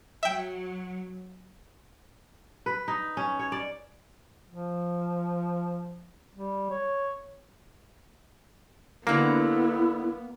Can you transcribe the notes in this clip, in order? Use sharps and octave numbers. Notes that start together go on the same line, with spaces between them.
F#3 E5 G5
B4
D#4
C#4
C#5
D5
F3
G3
C#5
D3 F#3 A#3 B3 E4